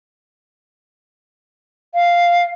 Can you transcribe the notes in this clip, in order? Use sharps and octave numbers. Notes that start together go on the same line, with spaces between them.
F5